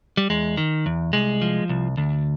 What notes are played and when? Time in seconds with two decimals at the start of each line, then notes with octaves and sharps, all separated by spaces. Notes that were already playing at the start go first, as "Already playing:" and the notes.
0.17 G3
0.30 E2 G#3
0.57 D#3
0.86 E2
1.13 C2 G#3
1.42 F3
1.69 C2
1.97 D2